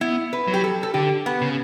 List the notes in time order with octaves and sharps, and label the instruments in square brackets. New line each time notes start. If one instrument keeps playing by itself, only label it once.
[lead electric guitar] B3 [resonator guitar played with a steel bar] E4
[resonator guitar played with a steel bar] B4
[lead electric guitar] F#3
[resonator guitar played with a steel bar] G4
A4
A4
[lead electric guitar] D3 [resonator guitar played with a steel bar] G4
[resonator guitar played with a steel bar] B3
[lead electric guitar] C#3